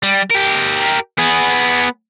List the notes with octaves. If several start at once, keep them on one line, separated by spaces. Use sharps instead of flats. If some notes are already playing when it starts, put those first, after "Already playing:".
G3
G4 A#4
B3 G#4